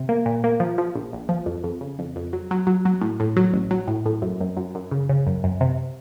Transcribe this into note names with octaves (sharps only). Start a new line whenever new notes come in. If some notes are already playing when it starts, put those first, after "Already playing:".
Already playing: C3
A#3
A#2
A#3
F3
F3
A#1
A#1
F3
F2
F2
C#3
F2
F2
F#3
F#3
F#3
F#3
A2
A2
F#3
A1
F#3
A2
A2
F#2
F#2
F#2
F#2
C#3
C#3
F#2
F#2
C3